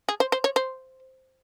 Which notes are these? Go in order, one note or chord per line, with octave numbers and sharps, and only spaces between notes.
G#4
C5
C5
C#5
C5